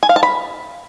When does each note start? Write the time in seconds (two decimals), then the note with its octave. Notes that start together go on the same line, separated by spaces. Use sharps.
0.03 G#5
0.09 F5
0.16 A5
0.23 B5